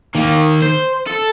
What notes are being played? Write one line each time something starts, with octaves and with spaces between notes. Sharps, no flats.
D#3 A#3
C5
A4